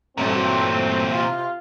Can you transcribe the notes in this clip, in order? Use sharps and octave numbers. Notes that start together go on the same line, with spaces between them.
G2 A#2 E3 F#3 A3 C4
C3 F4